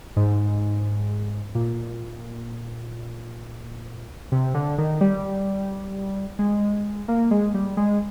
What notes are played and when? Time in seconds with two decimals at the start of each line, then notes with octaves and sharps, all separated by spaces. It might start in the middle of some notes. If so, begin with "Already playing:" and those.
0.16 G#2
1.55 A#2
4.32 C3
4.54 D3
4.78 D#3
5.01 G3
6.39 G#3
7.08 A#3
7.31 G#3
7.54 G3
7.77 G#3